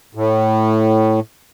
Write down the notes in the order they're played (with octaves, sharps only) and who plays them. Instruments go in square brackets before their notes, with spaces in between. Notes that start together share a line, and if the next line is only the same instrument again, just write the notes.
[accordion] A2